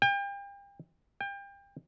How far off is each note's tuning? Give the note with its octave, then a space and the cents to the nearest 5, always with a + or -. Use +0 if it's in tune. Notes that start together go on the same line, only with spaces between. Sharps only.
G5 +35
G5 +30